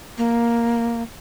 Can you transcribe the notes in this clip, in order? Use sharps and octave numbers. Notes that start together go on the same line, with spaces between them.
A#3